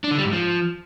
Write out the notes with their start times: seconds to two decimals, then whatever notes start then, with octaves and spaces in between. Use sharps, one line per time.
0.04 D4
0.11 D3
0.18 G3
0.25 G#2
0.32 F3